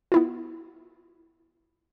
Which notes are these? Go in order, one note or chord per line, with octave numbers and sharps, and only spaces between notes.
B3 E4 F4